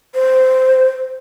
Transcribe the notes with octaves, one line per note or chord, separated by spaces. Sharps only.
C5